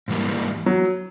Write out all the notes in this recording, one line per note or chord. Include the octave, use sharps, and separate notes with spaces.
G#2 E3 G3 A#3
F#3